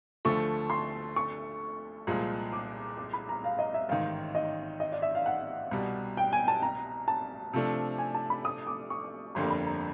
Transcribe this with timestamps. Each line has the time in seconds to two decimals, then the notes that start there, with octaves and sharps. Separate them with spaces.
0.25 D2 D3 F3 A3 C#6
0.70 C6
1.16 C#6
2.07 C2 A#2 F3 G#3
2.53 D6
2.98 D6
3.13 B5
3.29 A#5
3.44 F5
3.59 D#5
3.74 E5
3.89 A1 G#2 D#3 F5
4.35 D#5
4.80 D#5
4.92 D5
5.02 E5
5.15 F5
5.26 F#5
5.71 C2 B2 G3
6.17 G5
6.33 G#5
6.48 A5
6.62 A#5
7.08 A5
7.53 C3 F3 A3 D4
7.98 G#5
8.14 A5
8.30 B5
8.45 D#6
8.67 D6
8.90 C#6
9.35 G1 F2 D3 G3 A#3 C6
9.50 B5
9.66 A#5